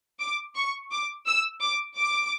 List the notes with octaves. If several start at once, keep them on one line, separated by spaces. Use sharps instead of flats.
D6
C#6
D6
E6
D6
D6